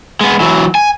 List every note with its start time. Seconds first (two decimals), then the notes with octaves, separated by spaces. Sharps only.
0.21 G#3 B3
0.40 E3 F#3
0.75 G#5